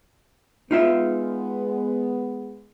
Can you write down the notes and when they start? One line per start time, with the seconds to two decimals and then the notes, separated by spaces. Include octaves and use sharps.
0.71 G#3 B3 D#4 F4 E5